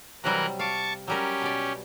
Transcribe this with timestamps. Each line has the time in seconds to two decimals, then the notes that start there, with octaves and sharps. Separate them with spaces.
0.24 C3 E3 F#3 G3 A#4 F#6
0.59 F5 A5 C#6 D6
1.08 F#3 G3 C#4 G4 A#4
1.42 B2 D5